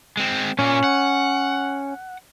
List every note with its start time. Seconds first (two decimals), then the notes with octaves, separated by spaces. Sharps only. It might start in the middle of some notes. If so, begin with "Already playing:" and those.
0.17 G#3 C4
0.59 A#2 A#3 C#4
0.84 F#5